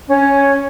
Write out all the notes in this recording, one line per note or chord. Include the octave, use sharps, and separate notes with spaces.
C#4